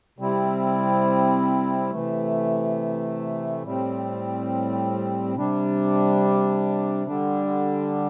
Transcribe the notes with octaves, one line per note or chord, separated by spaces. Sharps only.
C3 G3 C4 E4
C3 E3 A3
A2 G3 C4
C3 G3 D4
D3 G3 D4